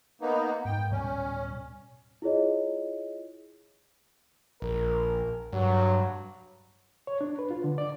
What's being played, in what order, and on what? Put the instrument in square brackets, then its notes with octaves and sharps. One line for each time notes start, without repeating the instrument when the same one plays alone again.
[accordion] A#3 B3 D#4
[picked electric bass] G#2 [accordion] G5
[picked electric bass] D1 B2 G3 [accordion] C#4
[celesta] E4 F4 G#4 C#5 D#5
[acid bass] A#1 [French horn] A#4
[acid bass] G2 [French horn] F#3
[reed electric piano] C#5
D4
B4
F4
D3
D5